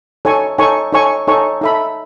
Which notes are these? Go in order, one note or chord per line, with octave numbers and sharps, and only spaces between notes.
D#4 A4 C#5 G#5 C#6
D#4 A4 C#5 G#5 C#6
D#4 A4 C#5 G#5 C#6
D#4 A4 C#5 G#5 C#6
D#4 A4 E5 B5